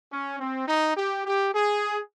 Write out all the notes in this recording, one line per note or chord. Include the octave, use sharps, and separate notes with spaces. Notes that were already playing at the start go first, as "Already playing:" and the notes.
C#4
C4
D#4
G4
G4
G#4